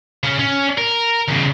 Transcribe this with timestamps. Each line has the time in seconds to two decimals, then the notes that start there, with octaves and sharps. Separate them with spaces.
0.23 C#3 C#4
0.39 C#4
0.78 A#4
1.29 E2 C#3